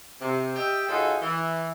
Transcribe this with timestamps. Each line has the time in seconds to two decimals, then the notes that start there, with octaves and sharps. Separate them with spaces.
0.21 C3
0.55 G4 D#5 E5 G5
0.89 A2 D#4 F4 F#4 G#4 A4
1.22 E3